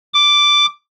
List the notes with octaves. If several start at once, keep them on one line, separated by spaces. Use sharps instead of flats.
D6